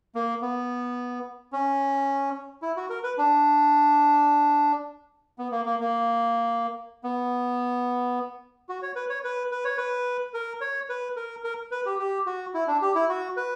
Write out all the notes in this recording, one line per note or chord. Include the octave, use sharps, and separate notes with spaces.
A#3
B3
C#4
E4
F#4
A#4
B4
D4
B3
A#3
A#3
A#3
B3
F#4
C#5
B4
C#5
B4
B4
C#5
B4
A#4
C#5
B4
A#4
A#4
B4
G4
G4
F#4
E4
D4
G4
E4
F#4
B4